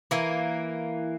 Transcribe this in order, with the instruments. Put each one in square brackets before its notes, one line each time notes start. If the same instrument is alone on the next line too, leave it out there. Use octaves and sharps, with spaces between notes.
[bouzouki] E3 A#3